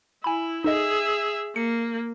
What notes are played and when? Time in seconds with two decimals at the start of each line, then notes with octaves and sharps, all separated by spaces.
0.24 E4 G#5 B5
0.64 D#4 G#4 A4 D#5 E5
1.56 A#3 C#7